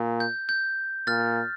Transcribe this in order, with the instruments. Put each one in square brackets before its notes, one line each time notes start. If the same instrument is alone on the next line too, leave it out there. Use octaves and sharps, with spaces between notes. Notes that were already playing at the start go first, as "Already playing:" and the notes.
Already playing: [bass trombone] A#2
[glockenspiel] G6
G6
[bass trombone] A#2 [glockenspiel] F6 A6